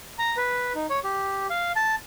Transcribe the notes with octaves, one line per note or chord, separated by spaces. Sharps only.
A#5
B4
D#4
C#5
G4
F5
A5